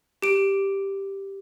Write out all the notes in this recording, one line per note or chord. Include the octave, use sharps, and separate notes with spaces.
G4 D7